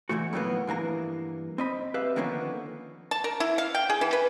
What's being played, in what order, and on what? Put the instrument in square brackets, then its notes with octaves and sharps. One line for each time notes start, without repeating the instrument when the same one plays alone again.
[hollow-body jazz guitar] A#2 E3 F3 A3 F#4
F2 A2 D#3 F#3 A#3 B3
G2 E3 A#3 A#5
C4 D#5 B5
G4 B4 E5 F5
D3 D#3 F3 A#3 B3 C#4
[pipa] A5
A#4
E4
F5
G5
G#4
E3
B4